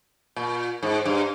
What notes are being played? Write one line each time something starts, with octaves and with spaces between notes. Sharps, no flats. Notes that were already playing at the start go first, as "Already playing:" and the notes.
A#2
G#2
G2